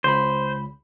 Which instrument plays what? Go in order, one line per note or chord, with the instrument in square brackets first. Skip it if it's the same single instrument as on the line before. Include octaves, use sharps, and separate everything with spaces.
[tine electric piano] C#2 B5 [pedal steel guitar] C5